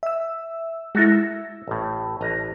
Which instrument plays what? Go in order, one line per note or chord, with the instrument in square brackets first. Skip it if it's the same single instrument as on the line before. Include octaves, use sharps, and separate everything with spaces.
[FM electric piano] E5 E6
[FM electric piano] G#3 E4 [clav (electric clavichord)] F#4 A4 A#4
[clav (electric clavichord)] E4 [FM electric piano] E6
[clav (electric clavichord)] A1 A2
A1 D#5 A#5